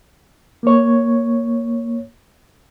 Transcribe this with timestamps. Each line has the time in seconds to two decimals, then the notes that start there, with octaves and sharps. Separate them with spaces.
0.63 A#3 C#5